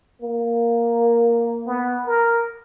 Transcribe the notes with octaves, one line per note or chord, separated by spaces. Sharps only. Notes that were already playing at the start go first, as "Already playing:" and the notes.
A#3
B3
A#4